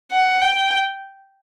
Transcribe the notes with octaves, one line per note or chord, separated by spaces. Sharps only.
F#5
G5